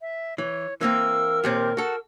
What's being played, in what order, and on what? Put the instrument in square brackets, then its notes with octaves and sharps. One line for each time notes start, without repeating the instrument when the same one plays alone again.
[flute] E5
[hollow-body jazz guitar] E3 [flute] C#5
[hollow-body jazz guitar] E3 A#3 C4 [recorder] A#4 [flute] E6
[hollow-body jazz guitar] D#2 A#2 C4 [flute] G4
[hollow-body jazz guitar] F#4 A4 [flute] F#5